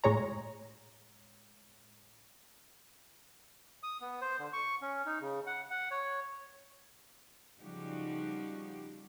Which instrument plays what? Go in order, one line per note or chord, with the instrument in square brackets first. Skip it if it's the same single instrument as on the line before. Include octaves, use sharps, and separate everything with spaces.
[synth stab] A2 G#3 C#5 A#5
[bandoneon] D#6
B3
C5
D3
C#6
C#4
D#4
C#3
F#5
F#5
C#5
[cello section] C#3 F3 G3 D#4 F#4 G4